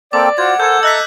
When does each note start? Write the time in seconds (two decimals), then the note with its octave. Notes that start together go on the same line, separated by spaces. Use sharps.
0.13 A#3 C4 A4 D5 G5 D6
0.38 F4 F#4 C5 F#5 G#6
0.60 A4 A#4 C5 G#5 G6 G#6
0.83 D#5 E5 A#5 E6 F#6 B6